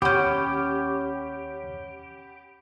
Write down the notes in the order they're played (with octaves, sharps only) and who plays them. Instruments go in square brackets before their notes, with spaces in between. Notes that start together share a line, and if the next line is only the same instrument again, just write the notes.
[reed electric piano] D#2 G6 [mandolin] C4 C#4 [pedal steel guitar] G4 [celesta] F#5 B5